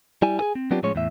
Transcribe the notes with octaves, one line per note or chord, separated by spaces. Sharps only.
G3 E4 G#5
G#4 A4 G#5
C4
F#3 B3 C4 D4 F4 G4
A2 F3 G#3 C#4 C#5
E2 A2 E5